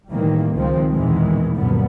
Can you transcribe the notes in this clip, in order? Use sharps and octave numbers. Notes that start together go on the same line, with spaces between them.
A2 C3 D#3 E3 G3 A#3
C#2 D#3 F3 G#3 C4
B1 E2 A#2 D#3 E3 G#3
C#2 F#2 A#2 D3 G3 B3